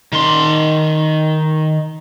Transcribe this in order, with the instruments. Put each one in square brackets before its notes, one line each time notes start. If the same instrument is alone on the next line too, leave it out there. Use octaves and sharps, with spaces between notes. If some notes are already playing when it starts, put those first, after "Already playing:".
[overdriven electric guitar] D#3 C6